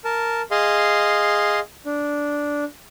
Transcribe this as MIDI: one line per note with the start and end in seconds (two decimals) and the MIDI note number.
0.04 0.42 70
0.04 0.42 81
0.51 1.60 68
0.51 1.60 75
0.51 1.60 77
0.51 1.60 84
1.85 2.64 62